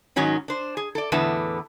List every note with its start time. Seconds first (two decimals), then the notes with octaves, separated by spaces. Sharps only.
0.16 G#2 D#3 F#3 C#4 D#4
0.48 D4 C5
0.77 G#4
0.95 A4 D5
1.12 E2 A2 D3 B3 A5